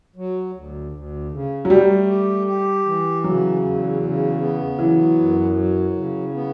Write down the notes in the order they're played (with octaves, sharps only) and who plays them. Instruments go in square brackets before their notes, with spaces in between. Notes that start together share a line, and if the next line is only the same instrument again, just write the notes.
[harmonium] F#3
D2
D2
C#3
[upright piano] F#3
[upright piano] G3 [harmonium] A3
[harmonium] G4
G4
E3
[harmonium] C#3 [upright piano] F#3
[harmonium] E2
C#3
B3
[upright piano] E3 [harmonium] F#3
[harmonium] F#2
F#3
C#3
B3